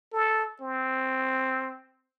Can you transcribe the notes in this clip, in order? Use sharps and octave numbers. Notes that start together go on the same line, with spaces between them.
A4
C4